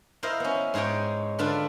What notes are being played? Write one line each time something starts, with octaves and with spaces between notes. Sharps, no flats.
E4 A#4 C5 D#5 F5
B3 C#4
G#2 G#3 G#4 C#5 G5
D3 D4 F4 B4 A5